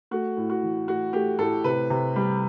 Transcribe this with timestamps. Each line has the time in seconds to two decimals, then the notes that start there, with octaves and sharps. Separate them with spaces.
0.11 A3 F#4
0.37 A2
0.50 F#4
0.63 E3
0.87 A2 F#4
1.13 A3 G4
1.39 A2 A4
1.64 C3 B4
1.90 C3
2.16 G3